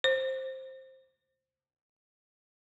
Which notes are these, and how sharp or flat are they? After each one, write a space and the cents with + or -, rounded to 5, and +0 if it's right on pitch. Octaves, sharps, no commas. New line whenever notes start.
C5 +10